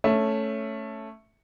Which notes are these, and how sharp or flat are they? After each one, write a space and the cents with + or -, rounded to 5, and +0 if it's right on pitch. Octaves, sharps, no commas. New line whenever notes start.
A3 +0 C#4 +0 E5 +0